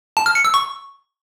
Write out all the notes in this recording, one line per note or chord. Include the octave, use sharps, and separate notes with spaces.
A5
F6
C#7
E6
C#6